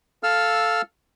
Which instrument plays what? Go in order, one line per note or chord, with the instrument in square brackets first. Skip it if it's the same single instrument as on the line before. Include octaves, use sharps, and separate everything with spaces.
[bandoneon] A4 F5 E6 F6